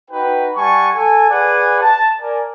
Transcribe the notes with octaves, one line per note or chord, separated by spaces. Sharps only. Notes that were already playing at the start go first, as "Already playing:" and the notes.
D#4 F#4 B4 G5
G3 F#5 G#5 A5 C#6
A4 G#5
G#4 B4 D5 F#5 G#5
A5
A#4 D5 G#5